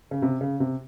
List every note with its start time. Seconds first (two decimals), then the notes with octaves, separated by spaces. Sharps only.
0.11 C#3
0.22 C3
0.41 C#3
0.60 C3